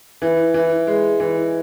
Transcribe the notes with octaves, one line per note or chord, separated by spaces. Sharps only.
E3
E3
G#3
E3